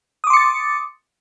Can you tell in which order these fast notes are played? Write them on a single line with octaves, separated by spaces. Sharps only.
D#6 D6 C6 C#7 A6